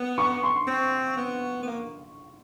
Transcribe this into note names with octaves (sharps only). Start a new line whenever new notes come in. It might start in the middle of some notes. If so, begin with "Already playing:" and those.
Already playing: B3
C#6
C6
C4
B3
B3
A#3